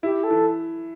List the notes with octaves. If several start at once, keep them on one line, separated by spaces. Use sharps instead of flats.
E4 G4
A4
E3